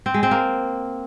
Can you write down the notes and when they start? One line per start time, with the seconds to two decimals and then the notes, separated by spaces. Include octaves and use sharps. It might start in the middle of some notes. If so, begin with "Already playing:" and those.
0.06 C4
0.14 G#3
0.23 C4
0.31 A#3